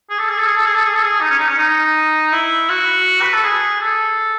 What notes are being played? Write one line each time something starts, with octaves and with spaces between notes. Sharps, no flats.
G#4
A4
G#4
A4
G#4
A4
G#4
A4
G#4
A4
G#4
D#4
C#4
D#4
C#4
D#4
E4
F#4
B4
A4
G#4
A4